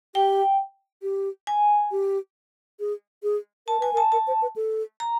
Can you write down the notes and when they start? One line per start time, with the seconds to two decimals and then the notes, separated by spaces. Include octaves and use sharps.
0.15 G4 G5
1.02 G4
1.47 G#5
1.91 G4
2.80 G#4
3.23 G#4
3.67 A#4 A5
3.80 B4 G#5
3.93 A#4
3.97 A5
4.12 A#4 A5
4.27 C5
4.42 B4
4.56 A4
5.00 A#5